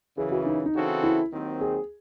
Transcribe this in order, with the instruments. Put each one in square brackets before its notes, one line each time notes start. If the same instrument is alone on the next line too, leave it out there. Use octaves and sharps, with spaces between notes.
[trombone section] F#2 C#3 E3 [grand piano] G#4
[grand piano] F#4
D#4
D#4
[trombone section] C#3 E3 C4 F#4 A4
[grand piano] E4
[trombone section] D#2 D#3 F#3 C4
[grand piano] G#4